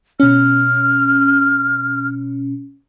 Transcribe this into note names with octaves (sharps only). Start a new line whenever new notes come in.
B2 C#4 F6